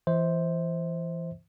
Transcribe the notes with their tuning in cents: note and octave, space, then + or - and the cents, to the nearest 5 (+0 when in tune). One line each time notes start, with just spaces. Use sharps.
E3 +25 C5 +0 E5 -35